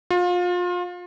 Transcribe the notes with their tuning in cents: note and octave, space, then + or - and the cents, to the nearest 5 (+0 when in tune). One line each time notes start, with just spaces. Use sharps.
F4 +30